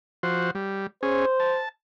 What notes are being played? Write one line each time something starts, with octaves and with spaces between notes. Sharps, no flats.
F3 F#4 C5
G3
C#4 G#4 C5
A5